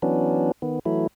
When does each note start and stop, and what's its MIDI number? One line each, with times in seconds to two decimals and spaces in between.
0.02 0.51 52
0.02 0.51 54
0.02 0.51 59
0.02 0.51 61
0.02 0.51 62
0.62 0.79 51
0.62 0.79 59
0.85 1.07 52
0.85 1.07 54
0.85 1.07 57
0.85 1.07 64